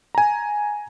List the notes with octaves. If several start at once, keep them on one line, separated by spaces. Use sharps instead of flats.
G#5 A#5